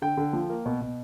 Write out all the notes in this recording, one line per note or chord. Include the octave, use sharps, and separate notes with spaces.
D3 G5
D3
F3
A#3
B2
B2